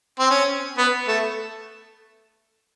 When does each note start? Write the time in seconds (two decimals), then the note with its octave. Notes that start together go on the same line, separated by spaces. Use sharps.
0.19 C4
0.30 C#4
0.78 B3
1.08 A3